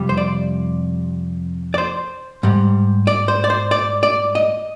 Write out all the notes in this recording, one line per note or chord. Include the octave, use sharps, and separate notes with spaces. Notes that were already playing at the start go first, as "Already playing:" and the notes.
Already playing: F2 C3 G3
C5
D5
D5
C5
G#2 G3
D5
C5
D5
C5
D5
D5
D#5